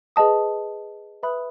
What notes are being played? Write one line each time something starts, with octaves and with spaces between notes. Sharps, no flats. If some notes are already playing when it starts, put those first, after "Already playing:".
G#4 B4 D#5 A5 D#6
B4 E5 B5 D#6 F#6